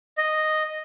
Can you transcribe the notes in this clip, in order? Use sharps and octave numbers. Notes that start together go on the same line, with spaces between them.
D#5